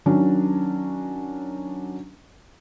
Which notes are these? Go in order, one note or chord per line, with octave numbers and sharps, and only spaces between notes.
D#3 F#3 C#4 D4